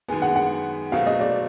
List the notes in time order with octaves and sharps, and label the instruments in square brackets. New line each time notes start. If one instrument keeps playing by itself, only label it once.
[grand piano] F#2 D#3 G#3 B3 [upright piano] G#5
[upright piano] F#5
F#5
[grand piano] B2 F#3 A3 C4 F4 [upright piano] F5
[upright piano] D#5
D5